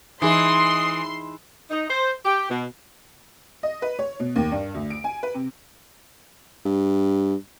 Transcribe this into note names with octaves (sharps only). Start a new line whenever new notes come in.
E3 D#4 G#4 E5 C6 D#6
D#4
C5
G4
B2
D#5
B4
C#5
B2
D#2
G2
D2
D7
G#5
B4
C3
G2